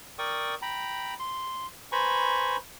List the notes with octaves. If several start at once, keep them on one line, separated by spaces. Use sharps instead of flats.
A#4 D5 G5 C#6 D#6
G5 A#5 B5
C6
B4 C5 G#5 A#5 B5 C#6